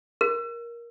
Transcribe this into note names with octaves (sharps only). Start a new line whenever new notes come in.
A#4